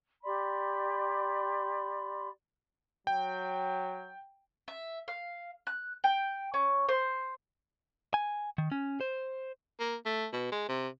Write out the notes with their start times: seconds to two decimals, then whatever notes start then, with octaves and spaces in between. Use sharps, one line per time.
0.23 G4 D5 B5 C6
3.07 F#3 G5
4.68 E5
5.08 F5
5.67 F#6
6.04 G5
6.54 C#4
6.89 C5
8.14 G#5
8.58 D#3
8.72 C#4
9.01 C5
9.80 A#3
10.06 A3
10.33 B2
10.52 G#3
10.69 C3